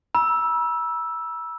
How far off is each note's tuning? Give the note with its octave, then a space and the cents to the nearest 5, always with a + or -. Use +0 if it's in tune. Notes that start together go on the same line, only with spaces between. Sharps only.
B5 -45 E6 +0